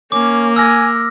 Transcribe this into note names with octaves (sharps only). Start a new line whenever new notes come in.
A#3 C#4 D6
G#5 E6 F6 A#6